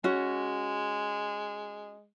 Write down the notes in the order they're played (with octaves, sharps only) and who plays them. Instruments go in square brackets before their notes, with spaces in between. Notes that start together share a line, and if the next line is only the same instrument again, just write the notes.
[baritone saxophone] G#3 [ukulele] C#4 F#4